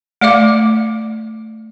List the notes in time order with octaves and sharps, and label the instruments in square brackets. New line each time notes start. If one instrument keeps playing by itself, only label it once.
[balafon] A3 D5 E5 F5 D6